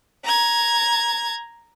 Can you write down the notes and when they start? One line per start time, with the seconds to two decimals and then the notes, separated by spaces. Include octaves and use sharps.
0.24 A#5 G#6